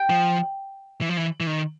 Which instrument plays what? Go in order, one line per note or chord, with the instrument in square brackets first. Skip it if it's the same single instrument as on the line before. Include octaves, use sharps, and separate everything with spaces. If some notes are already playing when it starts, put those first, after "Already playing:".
Already playing: [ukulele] G5
[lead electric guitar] F3
E3
F3
E3
E3
D#3